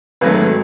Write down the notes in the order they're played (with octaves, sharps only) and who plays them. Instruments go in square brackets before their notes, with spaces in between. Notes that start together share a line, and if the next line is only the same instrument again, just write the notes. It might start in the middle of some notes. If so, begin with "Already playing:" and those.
[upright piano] G#1 G#2 F#3 A3 B4